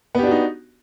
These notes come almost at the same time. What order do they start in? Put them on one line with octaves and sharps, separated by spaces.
B3 G4 D4 F#4 D#4